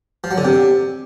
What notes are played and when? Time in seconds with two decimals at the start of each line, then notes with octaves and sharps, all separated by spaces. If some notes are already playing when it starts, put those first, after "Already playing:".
0.24 F3
0.31 F#3
0.38 D3
0.45 C3